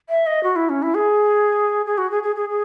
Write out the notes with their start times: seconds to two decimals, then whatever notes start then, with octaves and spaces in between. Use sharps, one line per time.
0.09 E5
0.27 D#5
0.43 F#4
0.56 E4
0.69 C#4
0.82 E4
0.95 G#4
1.86 G#4
1.98 F#4
2.11 G#4
2.23 G#4
2.36 G#4
2.49 G#4